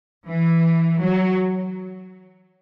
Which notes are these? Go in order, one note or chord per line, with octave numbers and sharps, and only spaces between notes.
E3
F#3